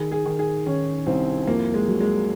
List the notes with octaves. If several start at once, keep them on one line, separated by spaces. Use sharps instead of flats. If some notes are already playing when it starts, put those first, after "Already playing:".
Already playing: D#3 G#4
G#4
D#3
G#4
D#3 C#4
C2 C4
F2 A#3
G#3
F#3
G#3